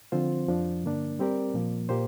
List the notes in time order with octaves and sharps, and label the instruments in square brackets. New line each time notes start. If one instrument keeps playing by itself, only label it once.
[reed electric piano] D3 F3 C4 F4 C5
F2 F3 D4
G2 D3 A#3 D4
G3 C4 G4 A#4 D5
A#2 F3 A#3
A#2 A#3 G4 C5